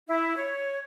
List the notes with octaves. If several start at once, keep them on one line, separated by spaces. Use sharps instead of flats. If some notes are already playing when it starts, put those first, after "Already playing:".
E4
C#5